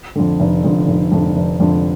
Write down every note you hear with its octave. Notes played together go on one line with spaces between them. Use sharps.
F2 D3
F1
F2 D3
F1
F2 D3
F1
F2 D3